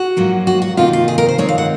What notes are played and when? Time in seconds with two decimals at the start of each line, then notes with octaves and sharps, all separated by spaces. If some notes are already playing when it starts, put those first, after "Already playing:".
Already playing: F#4
0.17 G#2 F#3 A#3 F4
0.47 F#4
0.62 F#4
0.77 C3 D#3 A#3 D#4 F4
0.93 F4
1.08 G#4
1.18 A#4
1.29 C5
1.38 D#3 G#3 C4 D#4 C#5
1.49 F5
1.58 F#5